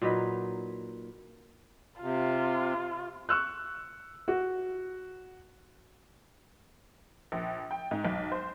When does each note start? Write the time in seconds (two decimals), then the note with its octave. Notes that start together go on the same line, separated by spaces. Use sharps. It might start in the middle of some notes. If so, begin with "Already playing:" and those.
0.02 A#2 F#3 D#4 B4
2.02 C3 F4
3.29 C#6 E6 F#6
4.28 F#4
7.32 A#1
7.71 G5
7.91 G#2
8.05 B1
8.32 C5